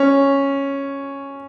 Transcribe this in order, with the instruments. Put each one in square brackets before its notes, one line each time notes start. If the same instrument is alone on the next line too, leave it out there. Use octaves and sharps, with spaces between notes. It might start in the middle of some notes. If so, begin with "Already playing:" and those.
Already playing: [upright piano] C#4